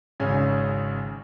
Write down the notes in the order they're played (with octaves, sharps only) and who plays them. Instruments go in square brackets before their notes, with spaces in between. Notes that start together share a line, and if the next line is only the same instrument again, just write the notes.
[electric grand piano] G#1 C#3 C#4 C#5 G#5